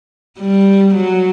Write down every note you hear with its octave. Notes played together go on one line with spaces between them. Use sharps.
G3
F#3